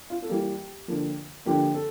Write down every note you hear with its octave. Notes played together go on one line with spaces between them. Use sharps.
F4
A4
E3 G3 A#3 G4
D3 F3 A#3
D3 F3 A#3 G4
A4